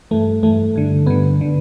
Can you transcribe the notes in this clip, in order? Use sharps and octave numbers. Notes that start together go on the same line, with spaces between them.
G2 E3 A3
G2 E3 A3
G2 D3
G2 D3 B3
D3